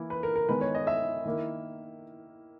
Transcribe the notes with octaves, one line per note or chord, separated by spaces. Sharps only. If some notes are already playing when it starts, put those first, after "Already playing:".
Already playing: E3 A#3 E4
B4
A#4
A#4
D#3 G#3 B3 B4
C#5
D#5
E5
D#3 A#3 E4